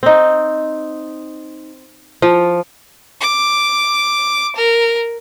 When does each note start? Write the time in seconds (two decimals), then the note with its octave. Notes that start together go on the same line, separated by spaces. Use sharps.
0.03 C4 D#4
2.22 F3
3.21 D6
4.56 A#4